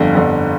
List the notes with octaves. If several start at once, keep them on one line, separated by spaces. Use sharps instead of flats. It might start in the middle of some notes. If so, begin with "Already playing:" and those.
Already playing: G1 F2 D3 F5
G1 F2 D3